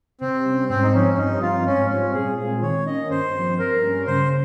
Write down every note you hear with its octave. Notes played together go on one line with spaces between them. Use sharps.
C3 C4
G3 C#4
G#2 C4
D#4
F3 C4 C#4 D#4
C#4
G2 D#4
F3 C4 F4
G#2 C#4
G3 C4 C#4 F4
A#2 G#4
G#3 C4 F4 G#4
D#3 C#5
A#3 C#4 D#5
G2 C5
F3 C4
G2 A#4
G3 A#3 C#4
C#3 C5